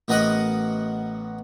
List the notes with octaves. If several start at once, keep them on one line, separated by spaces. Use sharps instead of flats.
A1 B3 A#4 D#5 F#5 D#6